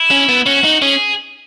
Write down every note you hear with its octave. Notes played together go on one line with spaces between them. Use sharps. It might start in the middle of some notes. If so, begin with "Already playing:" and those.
Already playing: E4
C#4
B3
C#4 F#4
D#4
C#4 G#4